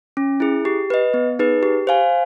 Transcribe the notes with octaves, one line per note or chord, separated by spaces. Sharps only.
C#4
E4 G#4
G4
B4 D#5
B3
D#4 G#4 B4
G4
C5 F5 G#5